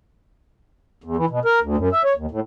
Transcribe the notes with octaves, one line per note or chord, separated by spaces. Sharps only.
E2
E3
B2
A#4
D2
F#2
E5
C#5
D#2
A2